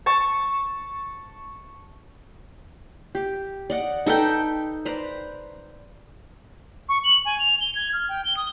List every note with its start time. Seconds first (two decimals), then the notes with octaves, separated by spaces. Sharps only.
0.06 A5 C#6
3.15 G4
3.70 D5 D#5 F#5
4.06 D#4 A4 B4 G5
4.85 B4 C5 D5 A#5
6.89 C#6
7.04 F#7
7.25 G#5
7.39 F7
7.60 G7
7.75 G#6
7.93 F6
8.09 G5
8.25 G7
8.37 D#6